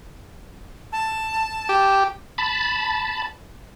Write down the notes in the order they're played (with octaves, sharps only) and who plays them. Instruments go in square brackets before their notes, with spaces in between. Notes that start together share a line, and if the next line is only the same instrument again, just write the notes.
[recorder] A5
[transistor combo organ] G4
[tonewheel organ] A5 B5